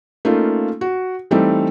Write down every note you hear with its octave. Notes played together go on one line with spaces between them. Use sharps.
A3 A#3 C#4 D#4 F4
F#4
E3 G3 A3 C4 D#4